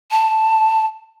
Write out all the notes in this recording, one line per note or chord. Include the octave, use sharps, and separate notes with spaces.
A5